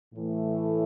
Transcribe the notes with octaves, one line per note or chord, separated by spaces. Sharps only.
A2 E3 A3